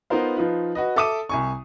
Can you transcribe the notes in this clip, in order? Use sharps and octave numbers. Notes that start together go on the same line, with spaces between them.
B3 D#4 F4 A#4 C5 F5
F3 D#4 F4 B4
F#4 B4 D#5
A4 E5 D6 D#6 D#7
C2 G#5 C#6